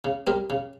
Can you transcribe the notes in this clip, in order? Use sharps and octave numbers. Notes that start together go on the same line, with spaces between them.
C#3
G3 C4 G4 A#4
C#3